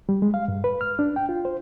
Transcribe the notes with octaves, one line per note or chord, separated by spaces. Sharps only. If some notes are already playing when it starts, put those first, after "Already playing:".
G3
G#3
F5
G2
B4
F6
D4
G5
F4
C5